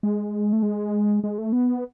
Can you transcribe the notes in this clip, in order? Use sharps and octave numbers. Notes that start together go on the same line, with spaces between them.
G#3
A3
G#3
G#3
A3
B3